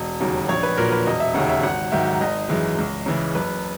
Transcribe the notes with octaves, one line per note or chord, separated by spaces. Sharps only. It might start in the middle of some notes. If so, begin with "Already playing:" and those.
Already playing: E1 D#5
D#2 C#3 F#3
A#1 C#5
B4
A#2 F#3 A#4
B4
E1 D#5
E5
D#2 C#3 F#5
E5
G#1 F#5
G#2 D#3 F#3 E5
G#1 D#5
F#2 E3 G#3
C#2
C#3 E3 G#3
F#1 B4